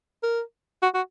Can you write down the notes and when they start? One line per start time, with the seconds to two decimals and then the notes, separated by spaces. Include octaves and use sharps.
0.23 A#4
0.82 F#4
0.94 F#4